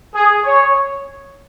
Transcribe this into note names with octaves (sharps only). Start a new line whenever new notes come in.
G#4
C#5